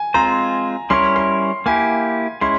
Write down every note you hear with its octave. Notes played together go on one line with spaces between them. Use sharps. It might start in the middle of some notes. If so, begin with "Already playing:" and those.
Already playing: G#5
G#3 C4 F4 C5 A#5
G3 C#4 E4 A#4 C#5 C6
C6
A#3 E4 G4 G#5
G#3 C#4 E4 C6